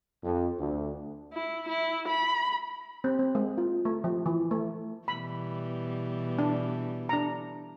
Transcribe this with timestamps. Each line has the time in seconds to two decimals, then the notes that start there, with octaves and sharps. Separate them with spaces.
0.24 F2
0.60 D2
1.34 E4
1.69 E4
2.08 B5
3.04 C4
3.19 C4
3.35 G#3
3.58 F4
3.85 A3
4.04 F3
4.26 E3
4.51 A3
5.08 B2 E3 G3 B5
6.39 D4
7.09 D4 A#5